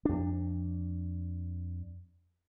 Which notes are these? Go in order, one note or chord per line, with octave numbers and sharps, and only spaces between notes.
F2 D4